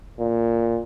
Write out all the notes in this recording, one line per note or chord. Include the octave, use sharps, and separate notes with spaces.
A#2